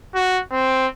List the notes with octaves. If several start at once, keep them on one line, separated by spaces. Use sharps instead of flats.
F#4
C4